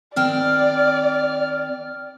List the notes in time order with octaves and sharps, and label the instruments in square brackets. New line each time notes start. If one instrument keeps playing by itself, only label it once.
[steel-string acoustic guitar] D#3 C4 G5 [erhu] D5 [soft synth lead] F6